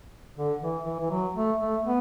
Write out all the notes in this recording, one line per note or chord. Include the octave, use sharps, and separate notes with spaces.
D3
E3
E3
E3
F#3
A3
A3
B3